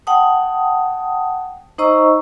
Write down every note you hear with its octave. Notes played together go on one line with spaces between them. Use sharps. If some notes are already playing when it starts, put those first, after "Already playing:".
F#5 G5 A5 D#6
D#4 C5 D#5 A#5 C#6 E6